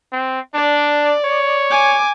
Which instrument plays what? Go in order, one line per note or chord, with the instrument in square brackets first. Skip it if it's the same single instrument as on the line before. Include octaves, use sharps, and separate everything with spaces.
[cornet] C4
[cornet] D4 [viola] D5
[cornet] C#5
[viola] G#5 D6